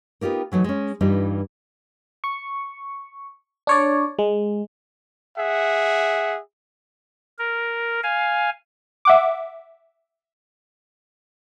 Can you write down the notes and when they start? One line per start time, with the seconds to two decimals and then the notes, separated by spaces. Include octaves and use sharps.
0.21 B3 D#4 F4 G4 A#4
0.52 E3 F#3 A3 D#4
0.64 G#3 C#4
1.01 G2 E3 G3 D#4 F4
2.24 C#6
3.67 D4 C#5 D5
4.19 G#3
5.37 G#4 E5 F#5
7.39 A#4
8.03 F5 G#5
9.05 E5 F#5 D6